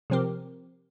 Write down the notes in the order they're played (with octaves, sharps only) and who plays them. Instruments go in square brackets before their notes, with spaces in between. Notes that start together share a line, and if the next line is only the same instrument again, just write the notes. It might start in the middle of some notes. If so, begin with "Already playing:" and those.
[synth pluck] C3 F3 C4 G4 A#4